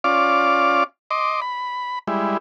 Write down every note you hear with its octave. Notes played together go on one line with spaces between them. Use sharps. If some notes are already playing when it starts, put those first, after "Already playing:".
C#4 F4 D5 F5 D6
D#5 C6 D6
B5
G3 G#3 E4